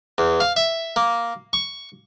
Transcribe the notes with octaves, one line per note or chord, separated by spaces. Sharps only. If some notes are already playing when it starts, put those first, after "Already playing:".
E2
F5
E5
A#3
C#6